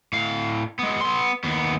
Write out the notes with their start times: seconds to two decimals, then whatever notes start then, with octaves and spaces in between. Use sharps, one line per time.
0.13 A2 F5
0.79 G#3 B3
1.01 B3 C6
1.44 D#2 B3